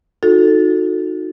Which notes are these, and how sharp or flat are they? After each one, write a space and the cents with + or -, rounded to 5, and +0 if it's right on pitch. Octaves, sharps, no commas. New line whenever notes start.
D#4 +0 F#4 -30 A4 +0